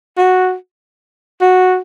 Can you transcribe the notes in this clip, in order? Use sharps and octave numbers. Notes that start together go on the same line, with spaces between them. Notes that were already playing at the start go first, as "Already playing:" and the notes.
F#4
F#4